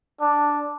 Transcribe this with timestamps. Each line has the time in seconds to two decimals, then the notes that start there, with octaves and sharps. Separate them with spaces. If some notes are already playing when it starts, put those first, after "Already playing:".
0.21 D4